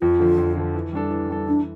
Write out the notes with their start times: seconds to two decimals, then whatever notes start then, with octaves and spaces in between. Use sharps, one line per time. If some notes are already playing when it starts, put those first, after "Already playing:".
0.01 F2 F4
0.20 D3 F3
0.38 F2
0.57 D3 F3
0.75 E3
0.93 G3 D4 A4
1.10 E3
1.29 G3 D4 A4
1.47 E3 D4